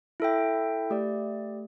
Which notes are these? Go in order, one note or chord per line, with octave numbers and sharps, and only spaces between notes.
E4 A4 E5 G5
A3 G4 D5